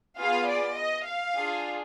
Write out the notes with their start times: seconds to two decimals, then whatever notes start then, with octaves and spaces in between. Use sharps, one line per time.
0.19 B3 F4 G#4 F5
0.48 D5
0.77 D#5
1.06 F5
1.36 D4 F4 G#4